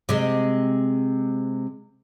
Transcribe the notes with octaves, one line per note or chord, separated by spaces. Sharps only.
C3 G#3